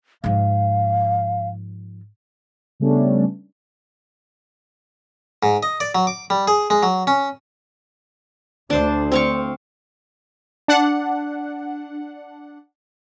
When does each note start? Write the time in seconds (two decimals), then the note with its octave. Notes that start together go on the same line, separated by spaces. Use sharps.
0.24 G#2 F3 F5
2.80 C#3 G3 A3 B3 C#4 D4
5.43 G#2
5.63 D#5
5.80 D5
5.95 F#3
6.07 D6
6.30 G3
6.48 G#4
6.70 G#3
6.83 F#3
7.07 C#4
8.70 D2 D4 C5
9.12 C4 F5 C#6
10.68 D4 F#5